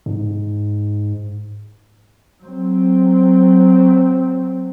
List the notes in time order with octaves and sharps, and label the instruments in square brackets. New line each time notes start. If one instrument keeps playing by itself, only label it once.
[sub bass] G#2
[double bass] F#3 C4